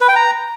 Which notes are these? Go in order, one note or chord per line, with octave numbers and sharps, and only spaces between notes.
B4
G5
A#5